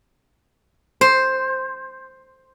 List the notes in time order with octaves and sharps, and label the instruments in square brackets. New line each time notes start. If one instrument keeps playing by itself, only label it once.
[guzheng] C5